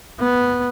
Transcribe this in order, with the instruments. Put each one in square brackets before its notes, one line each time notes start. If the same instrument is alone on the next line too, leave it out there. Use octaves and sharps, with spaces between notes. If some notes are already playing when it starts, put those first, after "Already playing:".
[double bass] B3